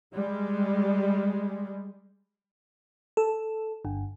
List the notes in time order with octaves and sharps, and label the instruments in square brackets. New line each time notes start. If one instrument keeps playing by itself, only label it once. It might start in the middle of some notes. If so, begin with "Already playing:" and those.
[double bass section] G3 G#3
[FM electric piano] A4
G1